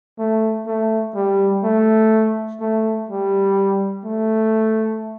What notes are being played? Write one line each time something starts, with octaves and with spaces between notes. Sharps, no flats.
A3
A3
G3
A3
A3
G3
A3